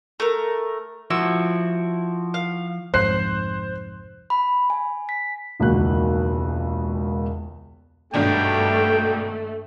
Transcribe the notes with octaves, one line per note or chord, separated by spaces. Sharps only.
A3 A#4
F3 E4 F#4 E6
F5
C2 F2 G#2 C5 F#6 C7
B5
G#5
B6
E1 C#2 D#3 A#3 F#4 F#6
G#1 G2 B2 A3 D4 G5